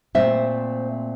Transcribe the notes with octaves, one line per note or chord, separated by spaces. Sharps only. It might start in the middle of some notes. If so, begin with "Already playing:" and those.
A#2 A3 C4 C5 E5